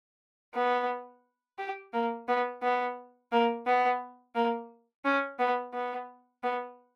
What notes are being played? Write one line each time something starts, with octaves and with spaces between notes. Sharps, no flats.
B3
G4
A#3
B3
B3
A#3
B3
A#3
C#4
B3
B3
B3